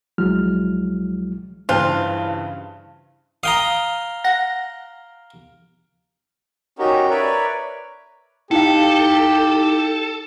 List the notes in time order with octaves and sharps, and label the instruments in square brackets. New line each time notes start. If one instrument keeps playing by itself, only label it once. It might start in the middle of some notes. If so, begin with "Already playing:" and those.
[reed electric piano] C2 F3 F#3 G#3 E4 F6
[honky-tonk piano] G2 C#3 E3 [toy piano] D4 C5 D5 [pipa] F4
[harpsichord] F5 G5 A#5 [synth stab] D#6
[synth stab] F#5 A#6
[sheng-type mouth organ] C#4 D#4 F#4 G4 A#4
A#4 B4 C#5 D5 E5
[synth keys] D#4 E4 [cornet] G4 [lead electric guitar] A4 [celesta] F5 G5